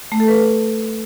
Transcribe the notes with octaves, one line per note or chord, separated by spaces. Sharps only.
A3
A4
B4